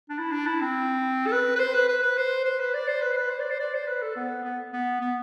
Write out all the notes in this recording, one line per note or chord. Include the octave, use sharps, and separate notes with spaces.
D4
E4
D4
E4
C4
A4
B4
B4
C5
B4
B4
B4
C5
C5
B4
D5
C5
B4
C5
B4
C5
D5
C5
D5
C5
B4
A4
B3
B3
B3
B3